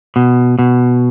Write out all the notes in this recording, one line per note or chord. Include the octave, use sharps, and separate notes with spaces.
B2
B2